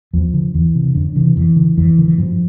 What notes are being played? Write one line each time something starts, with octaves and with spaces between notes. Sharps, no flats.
E2 F3
D3
E2 E3
C3
F2 D3
C3 E3
F2 E3
D3
F2 E3
D3
E3
G2 F3